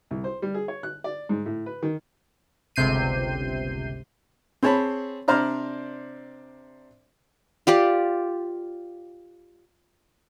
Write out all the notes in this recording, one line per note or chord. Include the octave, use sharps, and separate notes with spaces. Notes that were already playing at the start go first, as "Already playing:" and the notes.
C2
C5
G3
G#4
C#5
F#6
D5
G#2
A2
B4
D#3
G1 C#2 C3 G6 C7 D#7
C4 G#4 C#5 A5 B5
C3 D4 C5 D5 A#5 F6
F4 G4 D5